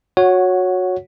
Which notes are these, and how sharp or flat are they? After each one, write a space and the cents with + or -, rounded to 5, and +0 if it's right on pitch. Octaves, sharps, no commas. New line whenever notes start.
F#4 -20 C#5 +0 F#5 -5